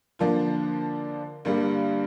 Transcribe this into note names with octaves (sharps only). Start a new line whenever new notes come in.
D3 F3 A#3 D4 F4
G2 D3 G3 A#3